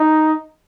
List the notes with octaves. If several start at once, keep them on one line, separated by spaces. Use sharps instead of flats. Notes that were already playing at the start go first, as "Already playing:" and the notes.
Already playing: D#4